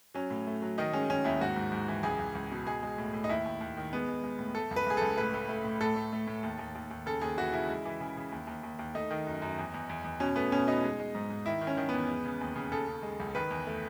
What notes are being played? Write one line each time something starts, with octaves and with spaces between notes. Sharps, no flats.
F#3 C#4
A2
A3
F#3
D#3 D#4
G#3 C#4
D#3 C#4
D#2 E4
G#2 F#4
G#2
G#2
E3
C#2 G#4
C#2
C#2
B2
G#3 G#4
G#3
A2
A2
D#4
D#2 E4
D#2
D#2
D#3
G#3 B3
G#3
G#3
A2
A3 A4
C#2
B4
C#2 G#4
C#2 A4
A2 B4
A3
A3
A2
A2 A4
A3
A3
A2
D#2
D#2
D#2
D#2
C#3 A4
D#2 G#4
E3 F#4
C#3 E4
G#3
E3
C#3
C#3
D#2
D#2
D#2
D#2
A3 D#4
D#3
F#2
F#2
E2
E2
E2
E2
B2 C#4
A3 B3
B2 C#4
B2 D#4
G#3
G#3
G#2
G#2
D#3 E4
D#3
C#4
D#3
B3
E2
G#3
C#3
D#2
C#3
C#3 A4
C#3
G#3
C#2
D#3 B4
E2
A3